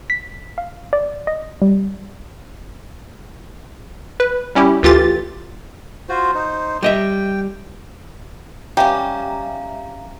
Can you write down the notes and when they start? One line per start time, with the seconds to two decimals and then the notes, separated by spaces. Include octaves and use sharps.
0.10 B6
0.58 F5
0.93 D5
1.27 D#5
1.62 G3
4.20 B4
4.55 G3 C#4 E4 G4
4.83 D2 E3 F4 G4 A4 A6
6.09 F4 F#4 C5
6.34 D#4 C5
6.83 G3 D#5 E5 G5
8.77 G3 C#4 G4 E5 F5 A#5